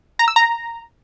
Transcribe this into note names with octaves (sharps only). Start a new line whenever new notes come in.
A#5
E6
A#5